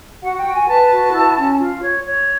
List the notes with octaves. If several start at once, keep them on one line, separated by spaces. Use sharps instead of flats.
F#4 F#5
G5
F#4
G#5
B4 A5
F#4
E4
C#4
F4
C#5
C#5